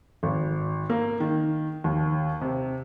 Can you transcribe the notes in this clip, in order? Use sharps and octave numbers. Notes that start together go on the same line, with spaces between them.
G#1
A#3
D#3
D#2
C3